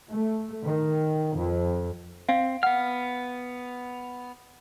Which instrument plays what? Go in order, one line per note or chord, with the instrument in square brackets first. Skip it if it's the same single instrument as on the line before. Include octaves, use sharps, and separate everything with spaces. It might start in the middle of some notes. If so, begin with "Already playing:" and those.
[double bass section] A3
D#3
F2
[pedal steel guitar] C4 [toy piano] F5
[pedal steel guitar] B3 F6 [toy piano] F#5